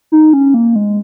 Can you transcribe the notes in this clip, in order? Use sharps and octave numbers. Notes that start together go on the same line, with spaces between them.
D#4
C#4
A#3
G#3